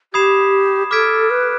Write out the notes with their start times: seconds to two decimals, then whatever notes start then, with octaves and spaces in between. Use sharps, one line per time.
0.14 G4 B5 D#6 G#6 C7 E7
0.91 A4 D6 F6 G#6 B6 D7
1.30 B4